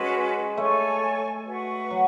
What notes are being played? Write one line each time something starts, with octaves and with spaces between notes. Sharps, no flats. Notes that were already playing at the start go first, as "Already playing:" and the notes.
Already playing: G#3 C#4 F#4 B4
A3 A4 C#5 G#5 C#6
F#4 B4 F#5 C#6
F#3